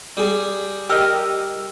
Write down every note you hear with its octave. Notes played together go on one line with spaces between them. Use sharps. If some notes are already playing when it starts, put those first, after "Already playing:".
G3 G#4
G4 A#4 D#5 G5 E6 F6